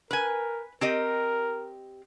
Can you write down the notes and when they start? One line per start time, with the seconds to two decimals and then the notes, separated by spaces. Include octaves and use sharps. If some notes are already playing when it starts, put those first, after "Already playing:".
0.11 A#4 B4 G#5
0.81 C4 G4 A#4 D#5